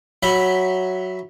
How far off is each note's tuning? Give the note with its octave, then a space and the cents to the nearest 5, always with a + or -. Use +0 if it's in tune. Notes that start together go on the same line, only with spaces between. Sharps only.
F#3 +0 E5 +5 B5 -5